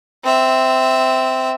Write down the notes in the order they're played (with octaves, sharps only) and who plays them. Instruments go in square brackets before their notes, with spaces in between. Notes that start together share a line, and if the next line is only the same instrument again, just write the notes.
[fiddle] C4 E5